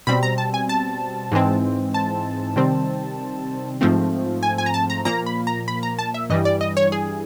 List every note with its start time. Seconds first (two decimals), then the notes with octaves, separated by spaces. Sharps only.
0.07 B2 G3 C4 B5
0.23 A#5
0.38 A5
0.54 G#5
0.69 A5
1.32 G#2 E3 G#3 C4
1.94 A5
2.56 C3 D#3 G3 C4
3.81 G#2 F3 A3 C4
4.43 G#5
4.58 G#5
4.66 A#5
4.74 A5
4.90 A#5
5.05 A#2 F3 A#3 A#5
5.26 B5
5.47 A#5
5.68 B5
5.83 A#5
5.99 A5
6.14 E5
6.30 G2 E3 G3 D#5
6.45 D5
6.61 D#5
6.77 C#5
6.92 G#4